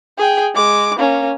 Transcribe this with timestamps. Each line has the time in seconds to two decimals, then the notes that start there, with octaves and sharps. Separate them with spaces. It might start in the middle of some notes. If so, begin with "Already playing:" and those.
0.18 G#4 G5
0.55 G#3 D6
0.98 A#3 C#4